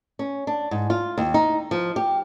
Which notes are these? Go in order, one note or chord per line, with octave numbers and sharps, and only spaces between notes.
C#4
D4
G#2
F4
D#2
D#4
F3
G4